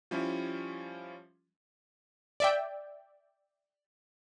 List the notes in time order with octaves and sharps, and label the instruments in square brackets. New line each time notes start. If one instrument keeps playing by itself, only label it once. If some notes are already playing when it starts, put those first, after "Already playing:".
[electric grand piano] F3 G3 C#4 E4
[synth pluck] D5 E5 G5